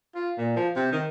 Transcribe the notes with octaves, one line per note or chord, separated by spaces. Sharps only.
F4
A#2
F3
C3
D#3